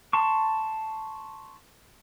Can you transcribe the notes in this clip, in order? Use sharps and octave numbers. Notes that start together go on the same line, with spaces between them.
A5 C6 C#6